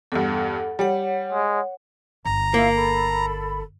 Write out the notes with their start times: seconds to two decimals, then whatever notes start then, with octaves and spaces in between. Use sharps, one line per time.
0.12 E2 G2 A4 F#5
0.79 G3 C#5 F#5
1.33 G#3
2.25 G1 A#5
2.54 A#3 E4 F4 F5
2.76 A4 B5